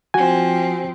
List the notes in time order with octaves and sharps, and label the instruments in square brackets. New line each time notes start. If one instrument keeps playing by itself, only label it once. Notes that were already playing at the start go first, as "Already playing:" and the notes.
[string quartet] F3 C4 [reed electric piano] F#4 G#5